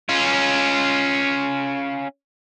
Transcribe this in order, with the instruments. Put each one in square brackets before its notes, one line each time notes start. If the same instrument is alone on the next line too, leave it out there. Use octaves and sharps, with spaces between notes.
[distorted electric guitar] C#4 F4